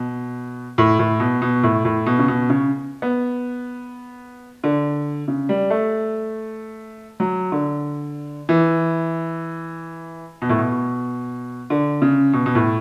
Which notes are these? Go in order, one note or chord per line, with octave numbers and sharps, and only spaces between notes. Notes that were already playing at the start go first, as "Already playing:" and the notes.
Already playing: B2
A2
A2
B2
B2
A2
A2
B2
C#3
B2
C#3
B3
D3
C#3
G3
A3
F#3
D3
E3
B2
A2
B2
D3
C#3
B2
B2
A2